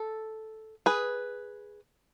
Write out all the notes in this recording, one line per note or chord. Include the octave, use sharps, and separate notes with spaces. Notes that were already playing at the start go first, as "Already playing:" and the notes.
Already playing: A4
G#4 B4